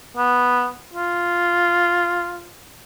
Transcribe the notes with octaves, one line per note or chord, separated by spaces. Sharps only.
B3
F4